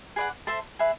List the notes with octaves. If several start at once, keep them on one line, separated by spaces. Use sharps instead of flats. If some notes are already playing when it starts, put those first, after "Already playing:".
G#4 B4 D5 F#5
A4 C5 E5 A5
G#4 B4 E5